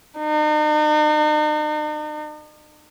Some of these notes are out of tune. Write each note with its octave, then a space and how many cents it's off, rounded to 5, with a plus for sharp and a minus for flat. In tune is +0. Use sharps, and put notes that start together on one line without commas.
D#4 -45